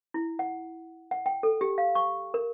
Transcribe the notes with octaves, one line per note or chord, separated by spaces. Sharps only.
E4
F#5
F#5
G5
A4
G4
F5
C#6
A#4